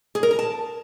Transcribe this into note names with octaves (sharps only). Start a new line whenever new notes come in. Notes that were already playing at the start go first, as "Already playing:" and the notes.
G#4
A#4
A#5
A5